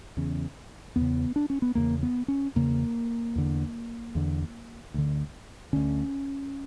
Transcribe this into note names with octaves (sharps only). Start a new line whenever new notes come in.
E2 C#3
E2 B3
C#3
D4
C#4
B3
E2 C#3 A#3
B3
C#4
E2 C#3 A#3
E2 D3
E2 D3
D2 D3
D2 D3 C#4